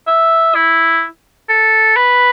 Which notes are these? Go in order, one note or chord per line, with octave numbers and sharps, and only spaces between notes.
E5
E4
A4
B4